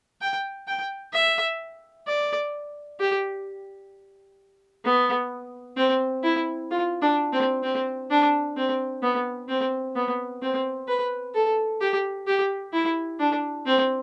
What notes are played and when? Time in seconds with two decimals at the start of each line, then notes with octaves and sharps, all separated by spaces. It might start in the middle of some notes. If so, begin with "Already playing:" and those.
0.21 G5
0.67 G5
1.13 E5
2.07 D5
3.00 G4
4.84 B3
5.77 C4
6.23 E4
6.71 F4
7.02 D4
7.33 C4
7.63 C4
8.10 D4
8.57 C4
9.02 B3
9.48 C4
9.95 B3
10.42 C4
10.88 B4
11.34 A4
11.81 G4
12.27 G4
12.73 E4
13.19 D4
13.66 C4